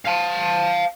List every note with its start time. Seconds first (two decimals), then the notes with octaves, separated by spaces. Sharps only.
0.05 F5 A5